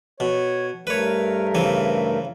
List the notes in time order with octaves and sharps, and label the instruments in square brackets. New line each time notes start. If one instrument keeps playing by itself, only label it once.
[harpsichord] B2 [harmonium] C#5
[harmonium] G2 A3 A#4 [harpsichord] B4 C#5
[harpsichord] C#3 E3 C4